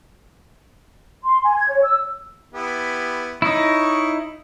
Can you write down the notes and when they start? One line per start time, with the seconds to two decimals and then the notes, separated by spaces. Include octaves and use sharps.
1.23 C6
1.43 G#5
1.57 G#6
1.69 C#5
1.83 E6
2.53 B3 E4 G4
3.42 D#4 E4 C#5 D#5 C#6